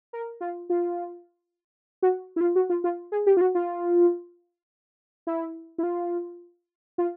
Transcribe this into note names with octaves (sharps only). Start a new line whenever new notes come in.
A#4
F4
F4
F#4
E4
F4
F#4
F4
F4
G#4
G4
F4
F#4
F4
E4
E4
F4
F4